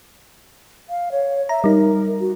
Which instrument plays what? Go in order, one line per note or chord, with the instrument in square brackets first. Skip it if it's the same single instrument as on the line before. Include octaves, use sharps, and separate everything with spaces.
[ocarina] F5
C#5
[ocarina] E5 [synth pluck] A#5
[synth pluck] G3 D#4 [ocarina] A#4
[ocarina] F#4